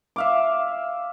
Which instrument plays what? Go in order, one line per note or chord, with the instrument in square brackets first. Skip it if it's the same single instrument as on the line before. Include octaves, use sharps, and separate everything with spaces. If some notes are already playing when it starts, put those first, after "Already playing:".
[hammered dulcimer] E5 F5 D6